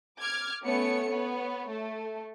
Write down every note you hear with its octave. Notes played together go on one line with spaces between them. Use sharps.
D6 F6 G#6
A3 B3 C#4 C#5 C#7
B3 C#5
A3